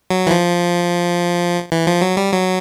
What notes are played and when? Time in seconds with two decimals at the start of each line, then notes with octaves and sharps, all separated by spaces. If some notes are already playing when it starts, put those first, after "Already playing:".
0.10 F#3
0.27 E3
0.31 F3
1.72 E3
1.86 F3
2.01 F#3
2.17 G3
2.32 F#3